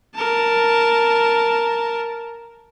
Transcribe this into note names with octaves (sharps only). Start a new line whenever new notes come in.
A#4 A5